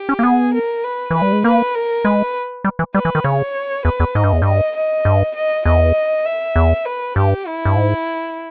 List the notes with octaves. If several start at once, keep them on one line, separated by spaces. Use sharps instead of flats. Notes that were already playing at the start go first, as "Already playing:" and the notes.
Already playing: G4
C#4
A#3
B3 G#4
A#4
B4
E3 B4
G3
G#3
A#3 B4
A#4
G#3 B4
G3
E3
G3 B4
E3
D#3
C#3 C#5
E2 B4
E2
G#2 D#5
G2
E2
G2 D#5
D#5
G2
D#5
E2 D#5
E5
E2
B4
G2 G4
E4
G2
G#2